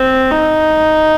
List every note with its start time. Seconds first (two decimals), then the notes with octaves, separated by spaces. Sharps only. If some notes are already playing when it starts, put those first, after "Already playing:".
Already playing: C4
0.31 D#4